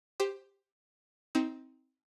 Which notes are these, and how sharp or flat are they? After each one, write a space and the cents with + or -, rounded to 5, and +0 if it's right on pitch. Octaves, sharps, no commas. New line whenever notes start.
G4 +10 C5 +0
C4 +0 D#4 +30 E6 -40